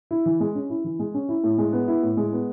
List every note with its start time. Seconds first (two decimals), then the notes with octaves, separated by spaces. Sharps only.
0.11 E4
0.26 E3
0.40 G#3
0.55 C#4
0.70 E4
0.84 E3
0.99 G#3
1.14 C#4
1.29 E4
1.44 A2
1.58 G#3
1.73 B3
1.88 E4
2.03 A2
2.17 G#3
2.32 B3